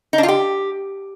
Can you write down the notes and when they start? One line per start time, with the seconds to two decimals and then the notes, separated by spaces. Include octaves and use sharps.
0.13 D#4
0.18 D4
0.23 F4
0.28 G4